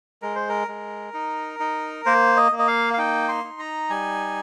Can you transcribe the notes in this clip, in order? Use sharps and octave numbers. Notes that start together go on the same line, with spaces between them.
G#3 A#4
C5
A#4
G#3
D#4
D#4
A#3 C5
D#5
A#3
D#5
F5
F5
D#4 G5
C6
D#4
A#5
G3 G#5